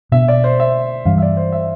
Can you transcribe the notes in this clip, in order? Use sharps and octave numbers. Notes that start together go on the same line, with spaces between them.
B2 B3 D4 E5
D5
C5
E5
G2 E3 G3 F5
E5
D5
C5
E5